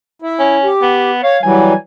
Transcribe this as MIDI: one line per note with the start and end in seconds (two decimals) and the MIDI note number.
0.22 0.57 64
0.39 0.68 61
0.64 1.10 67
0.82 1.21 59
1.23 1.37 73
1.23 1.43 77
1.43 1.73 52
1.43 1.73 54
1.43 1.73 55
1.43 1.76 80